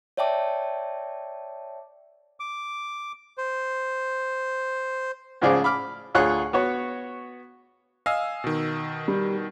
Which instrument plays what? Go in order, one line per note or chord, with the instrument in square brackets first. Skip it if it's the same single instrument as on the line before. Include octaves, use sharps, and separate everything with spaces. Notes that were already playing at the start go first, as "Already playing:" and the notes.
[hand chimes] C#5 D5 E5 G5 A5 D6
[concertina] D6
C5
[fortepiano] G#2 C#3 F3 F4 G#4 D5
B5 D6 F6
D2 F4 G#4 C#5 C#6 F#6
B3 F#4 C#5
[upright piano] D#5 [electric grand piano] F5 G#5 E6
[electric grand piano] B2 D#3
[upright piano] G3